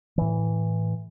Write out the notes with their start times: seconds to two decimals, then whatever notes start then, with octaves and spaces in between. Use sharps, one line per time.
0.18 A2 E3